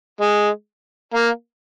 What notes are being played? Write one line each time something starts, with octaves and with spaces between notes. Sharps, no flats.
G#3
A#3